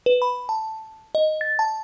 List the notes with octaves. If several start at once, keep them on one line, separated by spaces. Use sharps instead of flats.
B4
B5
A5
D#5
A6
A5